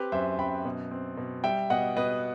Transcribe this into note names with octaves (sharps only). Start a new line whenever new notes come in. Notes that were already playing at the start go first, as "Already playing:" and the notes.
Already playing: C4 G4 B4
F#2 C5 E5
F#2 G5 B5
B2
C4
B2
G3 E5 G5
B2 D#5 F#5
B2 B4 D#5